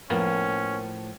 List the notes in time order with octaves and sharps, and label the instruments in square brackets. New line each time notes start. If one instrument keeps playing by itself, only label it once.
[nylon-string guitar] A2 F3 [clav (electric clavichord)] A#3 B3 [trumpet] C#4